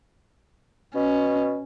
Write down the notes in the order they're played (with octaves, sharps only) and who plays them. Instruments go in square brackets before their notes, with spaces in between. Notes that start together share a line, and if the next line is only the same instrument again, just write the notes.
[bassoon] B2 [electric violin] C#4